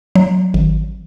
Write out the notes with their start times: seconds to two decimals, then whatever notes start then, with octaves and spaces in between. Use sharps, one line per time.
0.16 F#3
0.54 G#1